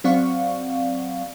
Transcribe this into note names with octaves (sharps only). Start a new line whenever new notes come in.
F#3 C4 D5 F5 F#5 C#6